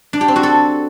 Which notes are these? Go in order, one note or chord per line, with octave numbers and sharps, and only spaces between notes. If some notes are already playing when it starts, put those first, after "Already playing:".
D4
G4
C4
F#4
A4